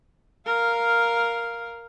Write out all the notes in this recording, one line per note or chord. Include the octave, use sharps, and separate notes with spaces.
A#4 F5